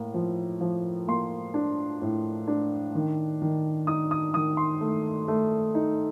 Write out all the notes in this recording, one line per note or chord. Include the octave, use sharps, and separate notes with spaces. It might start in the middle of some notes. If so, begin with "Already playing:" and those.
Already playing: A2 A#3
F3
F3
A#3 C6
D4
A2
D4
D#3
D#3
D#4 D#6
D#6
D#3 D#6
C6
A3
A3
D#4